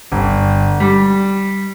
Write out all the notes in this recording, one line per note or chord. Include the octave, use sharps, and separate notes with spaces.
G1
G3